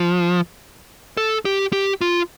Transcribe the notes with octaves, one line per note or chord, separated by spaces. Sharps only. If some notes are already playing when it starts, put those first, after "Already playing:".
Already playing: F3
A4
G4
G4
F4